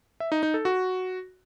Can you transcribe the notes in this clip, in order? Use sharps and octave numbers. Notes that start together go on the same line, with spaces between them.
E5
D#4
D#4
A4
F#4